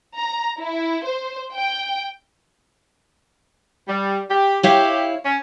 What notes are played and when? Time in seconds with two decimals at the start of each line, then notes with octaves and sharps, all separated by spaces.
0.18 A#5
0.60 E4
1.04 C5
1.55 G5
3.88 G3
4.30 G4
4.63 E4 G4 C#5 F5
5.23 C#4